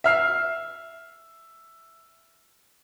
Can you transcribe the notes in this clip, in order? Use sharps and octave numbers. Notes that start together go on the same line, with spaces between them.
E5 F6 C7